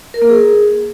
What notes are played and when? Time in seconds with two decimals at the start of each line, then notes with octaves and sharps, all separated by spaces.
0.14 A#4
0.22 A#3
0.29 G#4